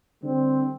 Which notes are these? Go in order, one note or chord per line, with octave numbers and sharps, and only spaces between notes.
D3 G3 C4